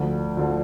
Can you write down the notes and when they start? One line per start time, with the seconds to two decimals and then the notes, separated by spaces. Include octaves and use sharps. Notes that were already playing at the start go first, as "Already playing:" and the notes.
Already playing: D2 D3 F3
0.37 D2 D3 F3